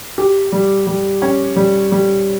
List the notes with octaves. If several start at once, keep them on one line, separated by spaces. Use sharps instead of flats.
G4
G3
G3
C#4
G3
G3